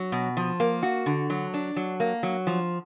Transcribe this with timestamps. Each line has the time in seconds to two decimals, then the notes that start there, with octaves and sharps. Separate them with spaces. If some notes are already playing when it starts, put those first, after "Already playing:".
Already playing: F#3
0.12 B2
0.37 F3
0.60 A#3
0.83 F#4
1.06 D3
1.30 F#3
1.54 D4
1.76 F#3
2.00 A#3
2.23 F#3
2.47 F3